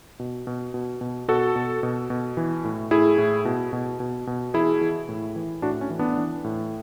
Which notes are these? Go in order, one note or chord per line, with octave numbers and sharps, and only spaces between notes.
B2
B2
B2
B2
B2 F#4 A4
B2
B2
B2
E3
A2
A2 E4 G#4
A2
B2
B2
B2
B2
E3 E4 G#4
E3
A2
E3
A2 D4 F#4
C#4
E3
B3 D4
E3
A2